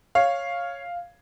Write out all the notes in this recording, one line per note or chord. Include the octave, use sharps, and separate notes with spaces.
C#5 F5